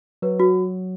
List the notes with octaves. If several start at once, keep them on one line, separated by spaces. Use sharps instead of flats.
F#3 B4
F#4